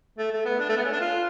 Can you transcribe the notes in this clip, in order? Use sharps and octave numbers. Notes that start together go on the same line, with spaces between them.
A3
A3
B3
D4
A3
B3
C#4
D4
F4